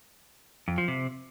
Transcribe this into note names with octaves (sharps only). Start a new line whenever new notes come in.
F2
F3
C3